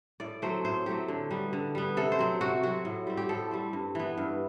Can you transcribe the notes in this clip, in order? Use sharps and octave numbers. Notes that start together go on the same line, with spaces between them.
A2 D5
F#3 A3 C4 C5
A2 C5
F#3 A3 C4 G4
D3
G3 B3
D3
G3 B3
C3 A4
C5
F#3 C4
C3 F#4
F#3 C4 F#4
A2
G3 C4
G4
A2 A4
G3 C4
G2
E3 B3
G2